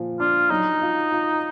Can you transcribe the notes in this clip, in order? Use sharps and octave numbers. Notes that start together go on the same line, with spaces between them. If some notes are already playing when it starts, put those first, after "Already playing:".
Already playing: A#2 F3
D4 F4
F#3 D#4
F4
F4